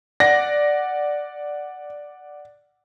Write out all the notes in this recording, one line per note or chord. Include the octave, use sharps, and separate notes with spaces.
D5 F#5 A#6